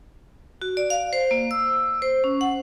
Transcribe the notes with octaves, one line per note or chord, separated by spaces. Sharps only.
F#4
D5
F5
C5
A#3
E6
C5
C#4
F#5